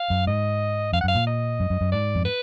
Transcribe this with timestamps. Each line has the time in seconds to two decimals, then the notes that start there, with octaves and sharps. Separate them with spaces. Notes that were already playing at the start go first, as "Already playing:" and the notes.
Already playing: F5
0.10 F#2
0.27 G#2 D#5
0.93 F2 F5
1.01 F#5
1.04 F#2 F5
1.15 A#2
1.27 D#5
1.60 F#2
1.70 F#2
1.81 F#2
1.92 G#2 D5
2.15 F2
2.25 B4